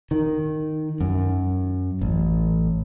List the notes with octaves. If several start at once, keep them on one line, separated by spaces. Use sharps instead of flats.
D#3
F#2
A1